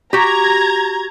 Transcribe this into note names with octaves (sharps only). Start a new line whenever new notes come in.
F#4 G4 A#5 G#6